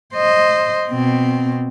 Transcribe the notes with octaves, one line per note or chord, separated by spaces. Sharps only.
C5 D#5
B2 C4